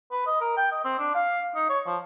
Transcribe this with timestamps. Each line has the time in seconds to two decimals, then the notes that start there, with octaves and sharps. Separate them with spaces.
0.12 B4
0.27 D#5
0.41 A#4
0.57 G5
0.72 D#5
0.85 C4
0.99 D4
1.15 F5
1.56 D#4
1.69 C#5
1.86 F3